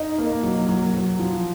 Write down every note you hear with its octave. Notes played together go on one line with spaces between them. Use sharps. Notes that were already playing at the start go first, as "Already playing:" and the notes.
Already playing: D#4
A#3
F#3
F#3
F#3
F3